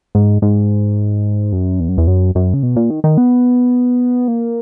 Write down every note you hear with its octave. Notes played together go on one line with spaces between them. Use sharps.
G#2
G#2
F#2
E2
F#2
E2
F#2
F#2
C#3
B2
A#2
D#3
D#3
B3
A#3